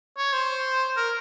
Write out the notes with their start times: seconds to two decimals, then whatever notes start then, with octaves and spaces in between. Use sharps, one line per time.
0.17 C#5
0.33 C5
0.97 A#4